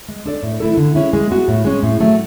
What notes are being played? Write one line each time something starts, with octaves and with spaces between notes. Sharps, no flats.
G#3
D4 A4 D5
A2
E3 A3 E4 A4
D3
G#3 C#4 E4
G#3
B3 F#4
A2
G#3 C#4
A2
F#3 A3